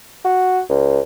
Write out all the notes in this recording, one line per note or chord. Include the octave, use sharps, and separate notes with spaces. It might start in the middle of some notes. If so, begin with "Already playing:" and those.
F#4
C#2